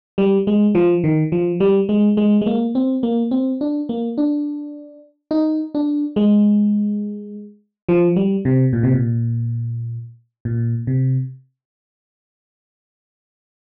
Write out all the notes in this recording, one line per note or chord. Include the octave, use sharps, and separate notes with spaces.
G3
G#3
F3
D#3
F3
G3
G#3
G#3
G#3
A#3
C4
A#3
C4
D4
A#3
D4
D#4
D4
G#3
F3
G3
C3
A#2
C3
A#2
A#2
C3